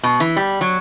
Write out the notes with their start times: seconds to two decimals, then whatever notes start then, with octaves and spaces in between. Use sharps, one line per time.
0.03 B2
0.20 E3
0.36 G3
0.61 F#3